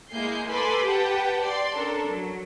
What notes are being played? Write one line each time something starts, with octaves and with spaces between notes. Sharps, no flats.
G#3 A#3 E4 G#4 G6 C7
A4 B4 G#5 B5 C6 D6
G4 B4 F#5 G5 A5
D5 C6
C#4 D4 A4 A#4
F#3